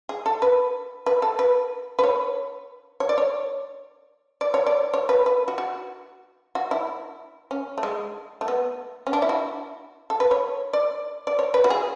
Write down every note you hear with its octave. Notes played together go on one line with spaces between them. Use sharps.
G#4
A4
B4
B4
A4
B4
B4
C#5
C#5
D5
C#5
D5
C#5
D5
C#5
B4
B4
F#4
F#4
F#4
E4
C#4
A3
G#3
A3
B3
C#4
D4
E4
F#4
A4
B4
C#5
D5
D5
C#5
B4
F#4
G#4